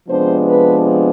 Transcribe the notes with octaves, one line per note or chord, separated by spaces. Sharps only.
C3 F3 G#3 B3 D4 C5
B4